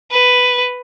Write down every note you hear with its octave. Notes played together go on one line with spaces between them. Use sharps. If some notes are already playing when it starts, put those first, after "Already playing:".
B4